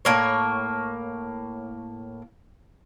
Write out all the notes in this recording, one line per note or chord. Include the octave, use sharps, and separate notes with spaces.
A2 A#3 C#5